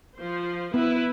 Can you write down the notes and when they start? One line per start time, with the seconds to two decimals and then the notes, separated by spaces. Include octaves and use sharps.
0.19 F3 C5
0.74 B3 E4 B4